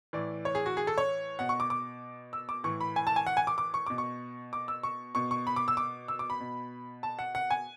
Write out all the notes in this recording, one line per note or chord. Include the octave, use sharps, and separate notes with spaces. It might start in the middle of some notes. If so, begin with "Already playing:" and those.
A2 E3 D5
C#5
G#4
F#4
G#4
A4
C#5
B2 F#5
C#6
D6
D6
E6
D6
A2 E3 C#6
B5
G#5
A5
G#5
F#5
G#5
D6
D6
C#6
B2 D6
C#6
D6
E6
C#6
B2 C#6
C#6
B5
D6
E6
D6
E6
D6
B5
B2
A5
F#5
F#5
G#5